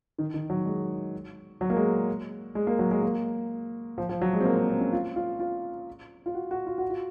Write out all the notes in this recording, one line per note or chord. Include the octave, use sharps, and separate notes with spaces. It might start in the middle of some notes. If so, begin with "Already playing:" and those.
D#3
D#3
F#3
G#3
F#3
A#3
G#3
G#3
A#3
F#3
G#3
A#3
F3
F3
F#3
G#3
C4
A#3
C4
C4
C#4
F4
F4
F4
F4
F#4
F#4
F4
F#4
F4